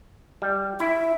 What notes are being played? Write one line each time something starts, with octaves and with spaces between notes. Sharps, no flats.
G3
E4 E5